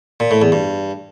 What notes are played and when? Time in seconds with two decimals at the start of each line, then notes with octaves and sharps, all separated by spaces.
0.20 A#2
0.31 A2
0.42 E2
0.52 G2